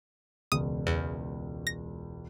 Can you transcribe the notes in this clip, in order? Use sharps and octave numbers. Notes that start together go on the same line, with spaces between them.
E1 C#2 D#6
E2
A#6